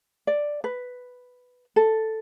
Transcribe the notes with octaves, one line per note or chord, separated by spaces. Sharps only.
D5
B4
A4